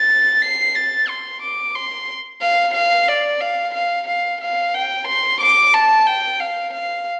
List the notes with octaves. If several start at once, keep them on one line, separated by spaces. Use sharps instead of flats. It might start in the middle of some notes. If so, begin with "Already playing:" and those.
Already playing: A6
C7
A6
C6
D6
C6
F5
F5
D5
F5
F5
F5
F5
G5
C6
D6
A5
G5
F5
F5